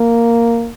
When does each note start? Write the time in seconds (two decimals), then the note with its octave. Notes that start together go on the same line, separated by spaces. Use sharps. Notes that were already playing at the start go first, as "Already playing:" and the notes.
Already playing: A#3